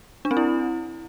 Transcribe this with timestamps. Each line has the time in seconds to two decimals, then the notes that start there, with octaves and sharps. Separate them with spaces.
0.25 D4
0.31 C4
0.37 E4